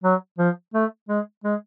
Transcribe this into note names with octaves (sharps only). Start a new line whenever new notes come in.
F#3
F3
A3
G#3
G#3